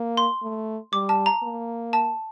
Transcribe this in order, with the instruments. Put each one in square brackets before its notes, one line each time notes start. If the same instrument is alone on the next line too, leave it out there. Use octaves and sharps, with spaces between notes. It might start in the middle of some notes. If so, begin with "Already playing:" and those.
Already playing: [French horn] A#3
[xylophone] C6
[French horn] A3
[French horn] G3 [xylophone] D6
[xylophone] A5
A#5
[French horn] A#3
[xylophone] A5